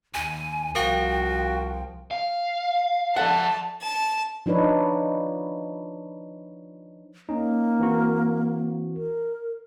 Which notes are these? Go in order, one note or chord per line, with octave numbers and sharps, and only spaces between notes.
D#2 G#5
C2 F3 F#4 A#4 F5 G5
F5
F3 A4 D5 E5 F#5 A5
A5
F3 D4 D#4 B4 C#5
A#3 C#4 D#4
E3 C4 F#4
A#4